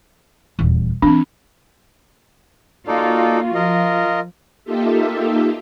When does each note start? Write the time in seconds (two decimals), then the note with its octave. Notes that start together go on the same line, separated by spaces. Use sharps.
0.59 D#1 E2
1.02 E3 C4 D4
2.88 A#3 D#4 F4 F#4 A4 D5
3.55 F3 F4 A#4 D#5
4.64 A#3 D#4 F4 G4 A4 E5